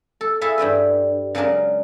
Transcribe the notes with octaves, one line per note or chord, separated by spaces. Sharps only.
A4
E4 G#4 A4 E5 F5
G2 G3 E4 B4
C#3 F#3 G#3 D4 A#4